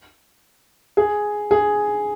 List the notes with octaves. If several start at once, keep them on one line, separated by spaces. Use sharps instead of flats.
G#4
G#4